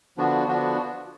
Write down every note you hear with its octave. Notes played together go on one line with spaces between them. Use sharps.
D3 F3 B3 D4 F#4
D3 F3 B3 D4 F#4